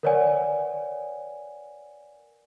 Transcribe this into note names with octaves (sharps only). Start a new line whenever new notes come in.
A#4 B4 C#5 D5 F#5 G#5